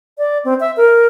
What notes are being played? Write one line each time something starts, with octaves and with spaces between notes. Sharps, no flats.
D5
C4
E5
A#4